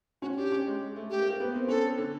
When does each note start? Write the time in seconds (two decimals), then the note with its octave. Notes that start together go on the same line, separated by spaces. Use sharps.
0.22 C#4 F#4
0.32 F#4
0.37 D4 G4
0.52 C#4
0.67 G#3
0.96 A3
1.10 A3 G4
1.19 A#3
1.30 A#3
1.40 B3
1.54 C4
1.68 C#4 A4
1.98 D3